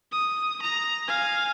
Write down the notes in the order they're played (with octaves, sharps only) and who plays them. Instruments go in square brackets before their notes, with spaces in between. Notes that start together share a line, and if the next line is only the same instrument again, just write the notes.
[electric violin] D#6
A#5
F5 G#5